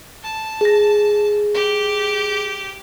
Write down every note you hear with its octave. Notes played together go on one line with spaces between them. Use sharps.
A5
G#4 A#6
G4